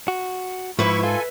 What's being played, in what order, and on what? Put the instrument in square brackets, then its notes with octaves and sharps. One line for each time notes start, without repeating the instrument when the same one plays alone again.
[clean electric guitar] F#4
[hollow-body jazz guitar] G#2 [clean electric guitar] F3 [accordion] E4 C#6 [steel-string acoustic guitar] B4 E5
[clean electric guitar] F4 [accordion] A4 G#5